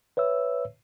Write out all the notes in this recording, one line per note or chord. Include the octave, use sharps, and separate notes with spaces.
B4 C#5 E5 E6